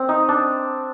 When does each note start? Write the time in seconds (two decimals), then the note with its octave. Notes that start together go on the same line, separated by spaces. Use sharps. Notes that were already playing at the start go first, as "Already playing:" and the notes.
Already playing: C4
0.09 D#4
0.29 D4